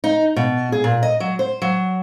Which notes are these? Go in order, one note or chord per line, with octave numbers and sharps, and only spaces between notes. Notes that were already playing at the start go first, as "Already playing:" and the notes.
D#4
B2
G#4
A#2
D#5
F#3
C5
F#3